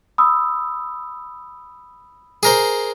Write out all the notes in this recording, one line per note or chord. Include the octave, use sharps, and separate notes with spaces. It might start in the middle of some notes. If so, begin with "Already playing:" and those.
B5 D#6 E6
G#4 A#4 C5